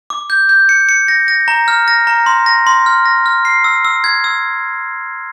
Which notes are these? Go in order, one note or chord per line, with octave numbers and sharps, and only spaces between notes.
D6
G6
G6
C#7
C#7
A#6
A#6
A#5
F6
A#6
A#5
C6
A#6
C6
F6
A#6
F6
C7
E6
E6
G#6
E6